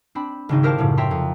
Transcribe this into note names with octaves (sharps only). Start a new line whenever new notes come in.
C4 D4 B5
G#1 C#3 D#4
E4 G4 A#4 C5 F5 A5
F1 F#2 A2 C#3
C#5 E5 G5 A#5 C6
F2